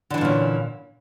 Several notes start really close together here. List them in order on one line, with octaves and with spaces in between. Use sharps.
D3 E3 D4 A#2 C#4